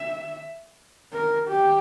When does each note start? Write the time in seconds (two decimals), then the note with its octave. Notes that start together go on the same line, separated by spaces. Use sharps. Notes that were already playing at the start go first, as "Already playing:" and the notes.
Already playing: E5
1.13 A#4
1.49 G4